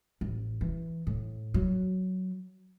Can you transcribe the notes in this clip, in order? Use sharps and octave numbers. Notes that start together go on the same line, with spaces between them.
A1
E3
A2
F#3